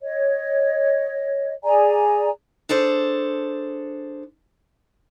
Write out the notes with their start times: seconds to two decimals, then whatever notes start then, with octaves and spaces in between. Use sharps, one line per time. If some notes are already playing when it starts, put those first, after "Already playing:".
0.01 C#5 D#5
1.64 G#4 D5 G#5 A#5
2.69 D4 G#4 A4 C5